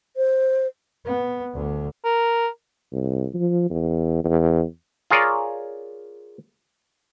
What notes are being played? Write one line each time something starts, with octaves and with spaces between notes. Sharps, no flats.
C5
B3
D2 D3
A#4
C2
F3
E2
E2
F4 G#4 A#4 C#5 D5